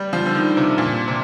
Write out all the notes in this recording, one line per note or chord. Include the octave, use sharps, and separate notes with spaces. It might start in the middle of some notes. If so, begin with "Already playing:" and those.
Already playing: G3
F3
D3
D#3
C3
A#2
C3